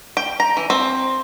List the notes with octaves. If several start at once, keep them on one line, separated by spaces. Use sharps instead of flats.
G5
A#5
E3
C4